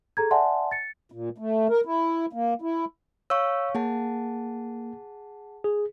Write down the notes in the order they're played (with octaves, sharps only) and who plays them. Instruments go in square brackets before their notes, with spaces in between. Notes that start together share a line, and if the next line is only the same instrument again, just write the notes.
[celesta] G#4 A4 A#5 G#6
D5 E5 F#5 G#5 A5 C6
A6 C#7
[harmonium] A#2
A3
A#4
E4
A#3
E4
[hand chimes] C#5 F5 C#6 [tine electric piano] E6
[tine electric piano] A#3 [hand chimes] G#4 F#5 A5
[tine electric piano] G#4